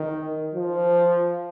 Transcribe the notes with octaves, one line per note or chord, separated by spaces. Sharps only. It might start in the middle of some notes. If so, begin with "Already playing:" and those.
Already playing: D#3
F3